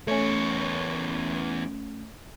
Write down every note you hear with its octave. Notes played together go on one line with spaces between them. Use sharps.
E2 A3 C#4 C#5